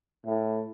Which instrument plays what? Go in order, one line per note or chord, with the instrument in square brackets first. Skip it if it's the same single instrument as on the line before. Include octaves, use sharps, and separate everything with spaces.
[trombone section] A2